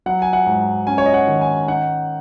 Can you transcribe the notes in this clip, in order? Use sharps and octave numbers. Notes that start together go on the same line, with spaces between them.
F#3 F#5
G#5
F#5
G#2
C#4 G#5
C#5
D#5
F#5
D#3
G#5
D#4 F#5